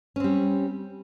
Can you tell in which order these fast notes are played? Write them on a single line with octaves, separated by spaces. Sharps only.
C#4 C4 G3